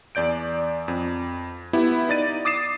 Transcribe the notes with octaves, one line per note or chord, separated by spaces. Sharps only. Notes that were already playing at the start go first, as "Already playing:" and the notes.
E2 D5 G6 D7
F2
B3 E4 G4
D#4 D5 A6 D#7
D6 D#6 A6 C7 E7